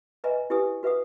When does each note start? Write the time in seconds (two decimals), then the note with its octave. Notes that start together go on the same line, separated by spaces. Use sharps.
0.24 B4 D#5 E5 G#5 A#5
0.50 E4 G4 B4 G#5 D#6
0.83 F#4 B4 E5 F#5 D#6